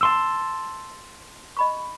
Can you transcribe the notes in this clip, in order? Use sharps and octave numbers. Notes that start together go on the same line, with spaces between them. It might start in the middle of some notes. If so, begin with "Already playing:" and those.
A5 C6 E6
D#5 B5 C#6